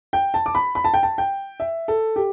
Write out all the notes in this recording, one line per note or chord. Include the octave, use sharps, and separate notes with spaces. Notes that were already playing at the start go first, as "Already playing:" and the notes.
G5
A5
D6
B5
B5
A5
G5
A5
G5
E5
A4
G4